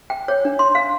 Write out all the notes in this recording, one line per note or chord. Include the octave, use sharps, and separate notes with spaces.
G5
C#5
D4
C6
F5